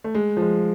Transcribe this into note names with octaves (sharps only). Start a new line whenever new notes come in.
A3
G#3
F3
G#3